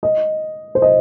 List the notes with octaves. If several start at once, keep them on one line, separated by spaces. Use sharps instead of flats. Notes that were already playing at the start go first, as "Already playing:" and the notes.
D#5
C5
D#5